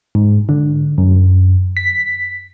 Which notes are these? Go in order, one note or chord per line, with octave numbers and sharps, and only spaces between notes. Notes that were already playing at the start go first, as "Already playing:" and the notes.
G#2
D3
F#2
B6